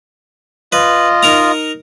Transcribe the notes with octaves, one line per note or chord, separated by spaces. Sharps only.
F4 B4 D#5
D#4 A#4 A#5